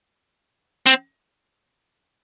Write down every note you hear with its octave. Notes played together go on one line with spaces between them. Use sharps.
C4